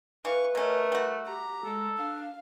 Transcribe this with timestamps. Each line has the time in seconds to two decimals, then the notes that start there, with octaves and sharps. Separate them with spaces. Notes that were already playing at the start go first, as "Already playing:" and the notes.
0.25 E3 B4 F5 C#6
0.55 B2 A3 C#4 A#4
0.92 G3 F#4
1.26 G4 A#5
1.64 G#3 A4
1.97 D4 F5